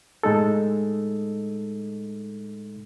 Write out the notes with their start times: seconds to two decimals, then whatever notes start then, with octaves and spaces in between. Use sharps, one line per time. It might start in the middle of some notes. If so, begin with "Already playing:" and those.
0.23 A2 G#3 D#4 A4